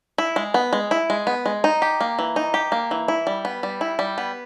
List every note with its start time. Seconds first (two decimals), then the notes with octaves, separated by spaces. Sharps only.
0.18 E4
0.36 G#3
0.54 B3
0.73 G#3
0.91 E4
1.10 G#3
1.27 B3
1.46 G#3
1.64 D#4
1.82 G4
2.01 A#3
2.19 E3
2.36 D#4
2.54 G4
2.72 A#3
2.91 E3
3.08 E4
3.27 G3
3.45 B3
3.63 G3
3.81 E4
3.99 G3
4.18 B3